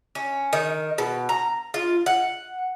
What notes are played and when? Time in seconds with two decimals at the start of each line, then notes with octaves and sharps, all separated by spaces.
0.15 C#4
0.53 D#3
0.98 B2
1.29 A#5
1.74 F4
2.06 F#5